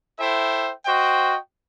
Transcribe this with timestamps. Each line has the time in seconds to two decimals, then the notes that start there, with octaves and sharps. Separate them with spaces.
0.19 E4 A4 C5 E5 G5
0.85 F#4 C5 D#5 G5